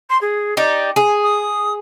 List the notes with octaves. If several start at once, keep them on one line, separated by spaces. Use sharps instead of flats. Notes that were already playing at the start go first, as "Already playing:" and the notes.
C6
G#4
D#4 G4 D5
G#4 G#5
D#6